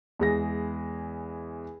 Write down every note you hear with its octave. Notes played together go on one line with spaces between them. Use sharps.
E2 G#3 A#6